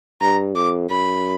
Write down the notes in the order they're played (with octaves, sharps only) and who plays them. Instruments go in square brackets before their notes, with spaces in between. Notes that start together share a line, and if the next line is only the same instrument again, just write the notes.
[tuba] G2 [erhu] A#5
[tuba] F2 [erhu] D6
[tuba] F#2 [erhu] B5